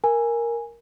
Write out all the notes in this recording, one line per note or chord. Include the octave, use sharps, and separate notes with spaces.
A#4 G#5